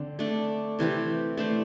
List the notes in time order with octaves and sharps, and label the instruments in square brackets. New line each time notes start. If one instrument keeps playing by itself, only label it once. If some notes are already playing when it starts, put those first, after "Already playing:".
Already playing: [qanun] D3 C4
A3 D4 A4
C3 E3 C4 G4
A3 D4 C5